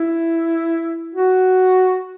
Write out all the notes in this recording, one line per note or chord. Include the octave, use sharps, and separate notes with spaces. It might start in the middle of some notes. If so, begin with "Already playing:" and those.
Already playing: E4
F#4